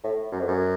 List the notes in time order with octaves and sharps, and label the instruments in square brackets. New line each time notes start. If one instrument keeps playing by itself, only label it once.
[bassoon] A2
F#2
F2
F#2